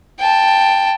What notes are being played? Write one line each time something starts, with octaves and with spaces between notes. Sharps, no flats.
G5 A5